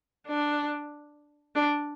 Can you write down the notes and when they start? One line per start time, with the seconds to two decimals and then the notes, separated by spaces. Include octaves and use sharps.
0.28 D4
1.55 D4